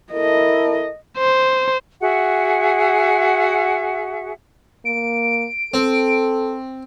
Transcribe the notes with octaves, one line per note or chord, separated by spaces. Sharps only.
E4 A4 A#4 D#5
C5
F#4 G#4 E5 F#5
A#3 D7
C4 A4